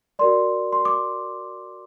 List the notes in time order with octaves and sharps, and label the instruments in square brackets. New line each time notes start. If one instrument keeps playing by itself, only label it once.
[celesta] F#4 A#4 D5 C6
C6
D6